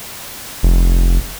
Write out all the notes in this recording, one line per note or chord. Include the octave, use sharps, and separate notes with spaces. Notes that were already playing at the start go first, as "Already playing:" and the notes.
F1